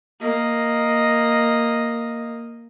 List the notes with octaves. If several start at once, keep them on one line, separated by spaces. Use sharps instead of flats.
A#3 D#5